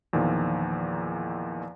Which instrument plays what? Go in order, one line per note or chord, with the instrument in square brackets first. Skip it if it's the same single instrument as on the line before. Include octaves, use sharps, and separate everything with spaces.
[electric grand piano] E2 A#2 D#3 F3